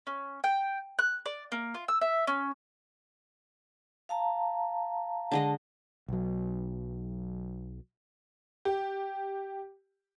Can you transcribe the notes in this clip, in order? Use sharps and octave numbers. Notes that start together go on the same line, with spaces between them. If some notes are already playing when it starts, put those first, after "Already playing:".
C#4
G5
F#6
D5
A#3
F4
E6
E5
C#4
F5 A5 A#5
D3 G#3 D#5 A5
B1 F#3
G4